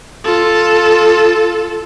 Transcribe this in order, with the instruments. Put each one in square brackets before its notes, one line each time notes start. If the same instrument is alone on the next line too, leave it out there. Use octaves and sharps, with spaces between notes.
[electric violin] F4 A4